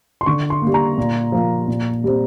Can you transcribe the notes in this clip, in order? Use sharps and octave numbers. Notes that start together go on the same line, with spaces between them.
C6
D3 C#6
C6
G3 A#3
A#5
A#2
F3 A#3
A#2
G3 C4